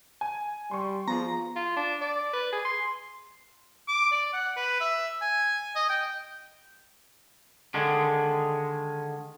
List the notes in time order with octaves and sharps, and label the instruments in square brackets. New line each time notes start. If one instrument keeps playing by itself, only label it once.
[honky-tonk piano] G#5
[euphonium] G3 [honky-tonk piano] C6 C#6
[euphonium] F3 [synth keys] B3 F4 G#4 [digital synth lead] A#5
[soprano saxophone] F4
D4
D5
B4
G#4
C6
[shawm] D6
D5
F#5
B4
E5
G#5
D#5
G5
[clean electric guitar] D3 D#3 G#3